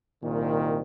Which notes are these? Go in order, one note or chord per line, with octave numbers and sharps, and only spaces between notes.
C2 A#2 D#3